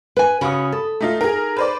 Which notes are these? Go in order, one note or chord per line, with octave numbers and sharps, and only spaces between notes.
B4 G#5
C#3 C#4 F#4 B5 D#6
A4
A3 D#4 F4
D#4 G#4 A#4
B4 C5 D5